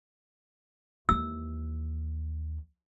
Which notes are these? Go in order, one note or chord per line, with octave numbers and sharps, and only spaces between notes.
D#2 E3 E6